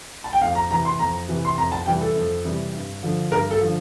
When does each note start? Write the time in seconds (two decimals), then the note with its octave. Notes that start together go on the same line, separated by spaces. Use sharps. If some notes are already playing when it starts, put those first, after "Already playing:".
0.24 A5
0.33 G5
0.41 F2 F5
0.55 A#5
0.70 C3 E3 A#5
0.85 C6
0.99 F2 A#5
1.28 C3 E3
1.45 C6
1.58 F2 A#5
1.72 A5
1.86 C3 E3 G3 G5
2.01 A4
2.16 F2
2.45 C3 E3 G3
2.73 G2
3.03 D3 F3
3.31 G2 A#4
3.51 A4
3.61 D3 F3